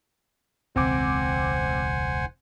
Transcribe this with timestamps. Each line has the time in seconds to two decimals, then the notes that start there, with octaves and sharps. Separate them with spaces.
0.76 E1 C#2 B2 C4 C5 F#5 G#5 D6